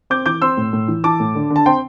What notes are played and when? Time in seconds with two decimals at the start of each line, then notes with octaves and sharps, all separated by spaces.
0.10 C4 D6 G6
0.26 E3 D6 G6
0.42 C4 C6 E6
0.57 A2
0.73 A2
0.88 E3
1.04 E3 A5 D6
1.20 A2
1.35 D3
1.50 D3
1.56 A5
1.66 C4 G5 C6